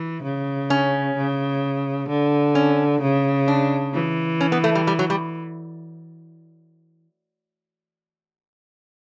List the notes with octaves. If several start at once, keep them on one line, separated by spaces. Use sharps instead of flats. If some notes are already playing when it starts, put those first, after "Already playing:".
Already playing: E3
C#3
C#4
C#3
D3
C#4
C#3
D4
E3
C#4
B3
A3
G3
G3
F#3
G3